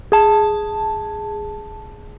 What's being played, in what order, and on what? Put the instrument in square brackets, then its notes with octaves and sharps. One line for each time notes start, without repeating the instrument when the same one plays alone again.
[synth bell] G#4 A5